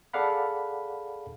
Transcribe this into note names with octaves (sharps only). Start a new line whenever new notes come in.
G#4 A4 D5 F5 F#5 B5